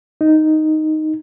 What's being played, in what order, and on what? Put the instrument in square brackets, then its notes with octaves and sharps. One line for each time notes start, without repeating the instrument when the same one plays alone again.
[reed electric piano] D#4